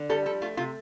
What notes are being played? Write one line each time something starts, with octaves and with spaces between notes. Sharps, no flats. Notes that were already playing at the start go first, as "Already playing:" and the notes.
Already playing: D3
G3 A4
F3 A4
A3 F4
C3 F4